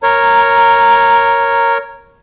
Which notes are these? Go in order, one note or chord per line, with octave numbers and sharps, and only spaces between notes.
A#4 C#5 A#5